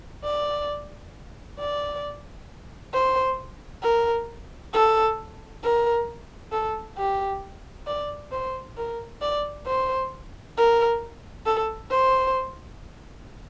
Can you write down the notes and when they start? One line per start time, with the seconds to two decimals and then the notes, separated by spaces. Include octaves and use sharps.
0.24 D5
1.59 D5
2.93 C5
3.83 A#4
4.74 A4
5.63 A#4
6.52 A4
6.98 G4
7.87 D5
8.32 C5
8.77 A#4
9.21 D5
9.66 C5
10.57 A#4
11.46 A4
11.91 C5